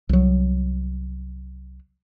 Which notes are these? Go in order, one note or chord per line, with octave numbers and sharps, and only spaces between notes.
C2 F#3